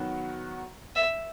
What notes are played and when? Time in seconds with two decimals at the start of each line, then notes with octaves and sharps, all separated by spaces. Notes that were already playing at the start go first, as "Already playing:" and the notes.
Already playing: D#3 F#3 B3 F#4
0.96 E5